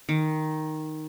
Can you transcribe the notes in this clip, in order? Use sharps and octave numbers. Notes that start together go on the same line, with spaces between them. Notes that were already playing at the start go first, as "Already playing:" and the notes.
D#3